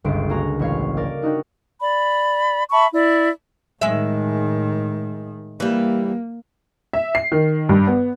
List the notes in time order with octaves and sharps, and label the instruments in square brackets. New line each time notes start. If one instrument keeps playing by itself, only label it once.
[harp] G1 C#2 C5 D7
A#3 C#4 F#4 A#5
A1 C#5 F5
A#4 D5
D4 D#4 F#4 G4
[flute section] D5 B5
E5 A5 B5 C#6
E4 D5
[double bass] A2 D#3 [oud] G#3 E5
[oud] E3 G3 [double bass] A#3
[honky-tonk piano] E5
C7
D#3
G2
B3